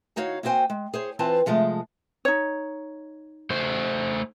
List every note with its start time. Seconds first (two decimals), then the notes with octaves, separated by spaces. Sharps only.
0.16 D#2 D#4 F#4 C#5 F5
0.43 A#3 C4 F#4 C5 G5 G#5
0.70 G#3
0.94 G#4 C5 C#5
1.19 E3 C4 F4 B4 C5 A5
1.46 C3 F3 G#3 A3
2.25 D#4 C#5
3.50 A3 C5